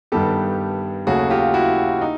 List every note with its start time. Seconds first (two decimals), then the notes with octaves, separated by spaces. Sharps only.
0.12 G2 D#3 G3 B3 G4 A4
1.07 D#2 C#3 F#3 A3 F#4 G#4
1.30 F4 G4
1.54 E4 F#4
2.02 D#4